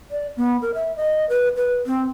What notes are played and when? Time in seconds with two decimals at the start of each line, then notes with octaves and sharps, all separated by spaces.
0.11 D5
0.37 B3
0.62 A#4
0.74 E5
0.96 D#5
1.29 B4
1.57 B4
1.86 C4